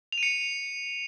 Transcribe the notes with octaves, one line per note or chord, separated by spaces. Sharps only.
F7
D#7
C#7